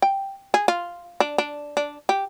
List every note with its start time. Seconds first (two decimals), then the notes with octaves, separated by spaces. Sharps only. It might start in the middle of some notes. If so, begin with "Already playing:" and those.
0.02 G5
0.54 G#4
0.68 F4
1.20 D4
1.38 D4
1.77 D4
2.09 G4